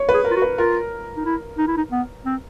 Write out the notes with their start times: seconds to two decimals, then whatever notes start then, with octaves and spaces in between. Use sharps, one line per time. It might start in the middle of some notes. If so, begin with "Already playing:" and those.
Already playing: C#5
0.09 B4
0.14 G#4
0.25 A#4
0.31 F4
0.36 F#4
0.42 B4
0.58 F4 A#4
1.17 D#4
1.25 E4
1.58 D#4
1.68 E4
1.77 D#4
1.92 B3
2.25 C4